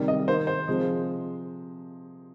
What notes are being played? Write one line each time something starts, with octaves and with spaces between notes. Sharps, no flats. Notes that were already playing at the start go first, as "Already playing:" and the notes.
Already playing: C3 D#3 G3 A#3
D#5
D#3 A#3 C5
C5
C3 F3 G#3